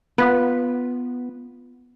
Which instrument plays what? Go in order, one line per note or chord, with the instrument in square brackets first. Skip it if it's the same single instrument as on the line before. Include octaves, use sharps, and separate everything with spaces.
[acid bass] B3 [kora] F4 B4